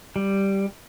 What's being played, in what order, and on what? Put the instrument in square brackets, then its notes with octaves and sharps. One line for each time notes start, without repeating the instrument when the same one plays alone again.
[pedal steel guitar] G3